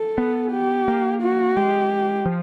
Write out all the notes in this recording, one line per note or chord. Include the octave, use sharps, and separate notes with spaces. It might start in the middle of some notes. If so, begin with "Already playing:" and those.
Already playing: A4
B3
G4
A#3
F#4
G#3 G4
F3